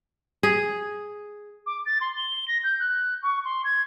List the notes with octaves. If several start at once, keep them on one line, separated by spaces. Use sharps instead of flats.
G#4
D6
A6
C6
G7
A#6
G6
F#6
C#6
C6
G#6